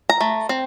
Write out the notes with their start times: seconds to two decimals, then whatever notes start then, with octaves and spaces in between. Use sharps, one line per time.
0.09 A#5
0.21 A3
0.49 C4